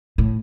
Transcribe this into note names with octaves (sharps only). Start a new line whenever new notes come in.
A2